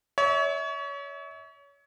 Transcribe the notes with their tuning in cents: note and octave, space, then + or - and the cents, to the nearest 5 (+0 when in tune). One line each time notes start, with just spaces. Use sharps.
C#5 +30 E5 -35